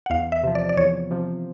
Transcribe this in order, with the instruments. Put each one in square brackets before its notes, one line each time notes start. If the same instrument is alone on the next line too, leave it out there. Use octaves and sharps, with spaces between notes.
[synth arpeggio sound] F#5
[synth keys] E2 [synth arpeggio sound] F5
[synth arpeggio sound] E5
[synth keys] C3 F3
[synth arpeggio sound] D5
D5
[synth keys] E2 [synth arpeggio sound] C#5
[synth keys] C3 F3